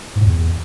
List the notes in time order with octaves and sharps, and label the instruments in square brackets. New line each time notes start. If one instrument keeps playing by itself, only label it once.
[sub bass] G#2
A2
E2